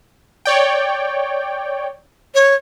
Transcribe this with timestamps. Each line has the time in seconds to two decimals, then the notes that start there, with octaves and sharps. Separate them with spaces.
0.45 C#5 D5 G5
2.34 C#5